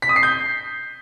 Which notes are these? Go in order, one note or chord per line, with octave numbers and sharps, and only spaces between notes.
B6
D#6
C7
G6